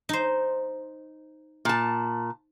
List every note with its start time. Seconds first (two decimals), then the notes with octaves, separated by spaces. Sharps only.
0.09 D#4 C5
1.65 A#2 A5